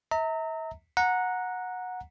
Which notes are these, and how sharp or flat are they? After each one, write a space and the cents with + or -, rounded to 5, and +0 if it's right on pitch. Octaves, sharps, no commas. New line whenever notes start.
E5 -40 A#5 -30
F#5 -15 A#5 +0